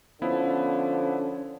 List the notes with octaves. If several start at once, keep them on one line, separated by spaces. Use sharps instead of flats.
D3 F3 B3 C#4 E4